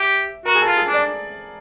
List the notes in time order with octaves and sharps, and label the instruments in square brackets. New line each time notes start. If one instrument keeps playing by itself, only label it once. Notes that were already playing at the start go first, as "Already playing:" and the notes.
Already playing: [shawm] G4 [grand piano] E5
[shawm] F#4 [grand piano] A#4
[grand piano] G#4
A4
[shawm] F4
[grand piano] G#4
[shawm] D4
[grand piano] D5